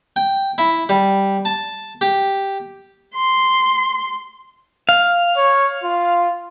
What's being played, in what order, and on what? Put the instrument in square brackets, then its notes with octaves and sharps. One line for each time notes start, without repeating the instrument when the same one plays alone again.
[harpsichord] G5
E4
G3
A5
G4
[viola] C6
[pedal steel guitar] F5
[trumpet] C#5
F4